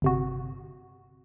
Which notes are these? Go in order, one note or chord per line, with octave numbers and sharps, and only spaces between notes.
G1 C3 F#4